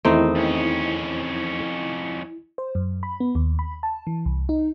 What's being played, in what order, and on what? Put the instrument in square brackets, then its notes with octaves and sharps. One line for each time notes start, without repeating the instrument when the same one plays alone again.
[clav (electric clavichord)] E2 D#3 A3 [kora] C4 D#4 [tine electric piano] E4
[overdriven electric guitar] F2 C#4
[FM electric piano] C5
F#2
B5
B3
D#2
B5
A5
E3
C2
D#4